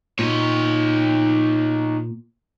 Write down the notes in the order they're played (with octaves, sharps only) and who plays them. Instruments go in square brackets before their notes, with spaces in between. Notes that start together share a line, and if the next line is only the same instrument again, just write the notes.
[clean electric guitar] A#2 [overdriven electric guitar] D#4 C#5